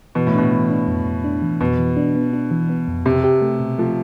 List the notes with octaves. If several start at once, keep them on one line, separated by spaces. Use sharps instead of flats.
B2 E3
A2
B2 D4
E3
D4
F2
F2
D4
E3
F2 B2
E3
D4
B3
D4
E3
B3
F2
C3 G4
G4
A3
B2
F3 A3